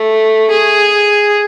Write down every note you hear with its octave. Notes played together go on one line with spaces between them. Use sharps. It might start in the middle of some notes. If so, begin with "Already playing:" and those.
Already playing: A3
G#4